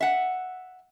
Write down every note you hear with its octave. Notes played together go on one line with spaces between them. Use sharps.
E5 F#5